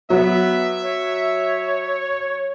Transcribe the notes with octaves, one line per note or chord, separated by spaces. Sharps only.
F#3 B3 E5
C#5